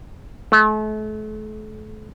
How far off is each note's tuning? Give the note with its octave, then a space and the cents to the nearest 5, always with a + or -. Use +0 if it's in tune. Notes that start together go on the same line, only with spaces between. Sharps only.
A3 -40